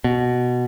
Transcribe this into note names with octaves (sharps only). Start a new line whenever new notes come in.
B2